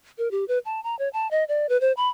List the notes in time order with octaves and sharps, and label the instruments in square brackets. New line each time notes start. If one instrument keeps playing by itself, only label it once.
[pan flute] A#4
G4
B4
A5
A#5
C#5
A5
D#5
D5
B4
C5
B5